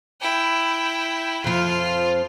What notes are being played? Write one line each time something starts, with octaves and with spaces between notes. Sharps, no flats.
E4 G5
F2 F3 F4